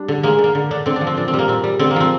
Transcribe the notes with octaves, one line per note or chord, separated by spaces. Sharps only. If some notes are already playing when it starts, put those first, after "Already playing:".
Already playing: G3 D4
D3
G#3 A#3
D3
A#3
D3
D3 D4
D3 C4
D4
F3
C4
A#2 D4
C4
G3
A#3
A#2 C4
G3
D3 C4
A#3
F3 C4